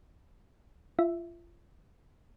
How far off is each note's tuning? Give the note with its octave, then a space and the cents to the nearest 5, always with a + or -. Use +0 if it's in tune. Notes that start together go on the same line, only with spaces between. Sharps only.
F4 -30 E5 +0